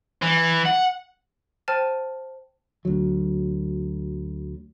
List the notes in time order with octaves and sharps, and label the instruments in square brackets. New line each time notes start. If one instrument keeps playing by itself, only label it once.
[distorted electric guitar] E3
F#5
[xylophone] C5 G5 A5 F6 A6 D#7
[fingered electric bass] D2 F#3